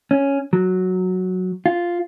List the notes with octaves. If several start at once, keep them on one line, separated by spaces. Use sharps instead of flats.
C#4
F#3
F4